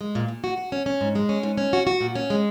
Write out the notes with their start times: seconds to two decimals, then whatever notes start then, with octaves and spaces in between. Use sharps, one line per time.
0.01 G#3
0.15 A#2
0.28 A#2
0.44 F#4
0.58 F#4
0.72 C#4
0.86 C#4
1.01 G#2
1.15 G#3
1.29 C#4
1.43 G#2
1.58 C#4
1.73 F#4
1.87 F#4
2.01 A#2
2.15 C#4
2.30 G#3